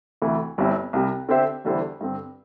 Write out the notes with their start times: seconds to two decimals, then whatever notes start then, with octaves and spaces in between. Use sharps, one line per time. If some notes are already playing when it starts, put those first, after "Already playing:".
0.22 D2 C3 E3 A3 E4
0.58 G1 G2 G3 C4 E4
0.93 C2 C3 G3
1.29 D3 C4 G4 C5 E5
1.65 E2 D3 G3 E4 C5
2.01 G2 D3 C4